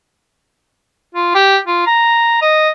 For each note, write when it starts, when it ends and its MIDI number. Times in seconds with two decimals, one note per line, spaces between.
1.15 1.33 65
1.35 1.58 67
1.67 1.82 65
1.87 2.37 82
2.42 2.69 75